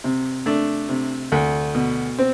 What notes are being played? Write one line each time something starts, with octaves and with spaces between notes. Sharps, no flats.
C3
A3 D4
C3
D2
B2
C4